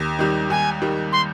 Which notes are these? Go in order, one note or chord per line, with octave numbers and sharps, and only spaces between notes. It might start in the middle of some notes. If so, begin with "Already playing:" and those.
Already playing: D#2
D#3 G3
D#2 G#5
D#3 G3
C6